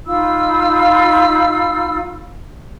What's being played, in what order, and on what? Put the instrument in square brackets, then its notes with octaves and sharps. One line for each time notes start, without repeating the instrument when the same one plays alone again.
[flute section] D#4 F4 B5 E6